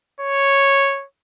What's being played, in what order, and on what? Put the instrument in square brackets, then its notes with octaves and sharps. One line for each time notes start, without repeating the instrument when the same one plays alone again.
[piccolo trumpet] C#5